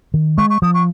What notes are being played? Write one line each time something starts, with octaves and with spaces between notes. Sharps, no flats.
D#3
G#3 C#6
C#6
F3 D#6
C#6